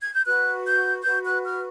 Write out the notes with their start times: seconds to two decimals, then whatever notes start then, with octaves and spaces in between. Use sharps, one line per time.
0.02 G#6
0.14 G6
0.25 F#4 B4 F#6
0.65 G6
1.04 F#4 B4 G6
1.24 F#6
1.45 F6